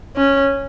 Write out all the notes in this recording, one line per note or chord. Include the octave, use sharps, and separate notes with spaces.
C#4